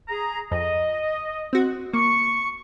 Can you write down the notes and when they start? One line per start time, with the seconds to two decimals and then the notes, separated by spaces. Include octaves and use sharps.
0.08 G#4 A#5
0.52 F2 D#5
1.53 C4 F#4
1.93 A#3 C#6